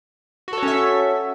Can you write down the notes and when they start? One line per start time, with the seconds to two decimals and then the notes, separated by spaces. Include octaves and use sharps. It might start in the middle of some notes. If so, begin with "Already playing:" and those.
0.48 F#4
0.53 A4
0.58 C#5
0.63 C#4
0.68 E5